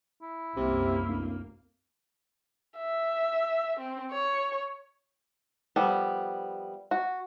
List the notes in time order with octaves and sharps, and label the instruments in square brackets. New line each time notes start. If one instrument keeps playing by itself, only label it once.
[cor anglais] E4
[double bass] C2 F#2 [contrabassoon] C3 [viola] A#3
[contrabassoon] D1
[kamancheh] E5
C4
C#5
[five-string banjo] F3 G3 B3 A4
F#4